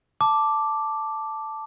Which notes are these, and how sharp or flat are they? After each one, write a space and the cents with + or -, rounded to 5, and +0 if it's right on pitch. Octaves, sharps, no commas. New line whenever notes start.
A5 +0 D6 +0